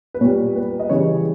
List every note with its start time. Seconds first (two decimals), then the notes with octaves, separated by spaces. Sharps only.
0.14 B4
0.21 A#2 G3 C#5
0.56 B4
0.80 D#5
0.90 C#3 E3 G3 C#5